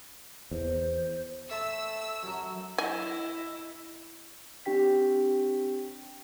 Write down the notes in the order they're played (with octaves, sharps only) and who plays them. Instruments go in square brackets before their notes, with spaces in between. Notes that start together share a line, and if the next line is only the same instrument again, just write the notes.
[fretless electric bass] E2 [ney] C5
[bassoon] A3 [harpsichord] E5 A5 C6 [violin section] E6
[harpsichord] F#2 F#3
[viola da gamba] E4 [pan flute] D#5 [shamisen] G#5
[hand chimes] C4 D4 G4 G5 B6